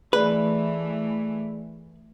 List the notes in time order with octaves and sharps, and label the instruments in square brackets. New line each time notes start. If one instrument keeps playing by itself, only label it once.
[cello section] E3 A3 [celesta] G#4 D5 B5 [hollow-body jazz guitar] B4